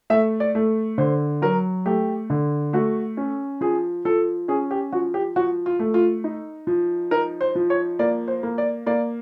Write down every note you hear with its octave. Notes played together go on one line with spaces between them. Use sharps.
A3 E5
D5
A3
D3 C5
F#3 A#4
A3 G4
D3
A3 F#4
C#4
F3 G#4
F3 A4
C#4 G#4
G4
F3 F#4
G4
F3 F#4
F4
A3
F4
D#4
F3
D#4 A#4
C5
F3
C#5
A#3 D5
C5
A#3
D5
A#3 D5